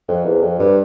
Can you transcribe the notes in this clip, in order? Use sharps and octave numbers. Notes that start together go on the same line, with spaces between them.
F2
E2
F2
G2